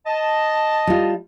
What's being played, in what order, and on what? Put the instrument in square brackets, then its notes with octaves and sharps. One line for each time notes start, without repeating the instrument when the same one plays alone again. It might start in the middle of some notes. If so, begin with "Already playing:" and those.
[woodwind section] D#5 A5
[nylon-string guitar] G3 F4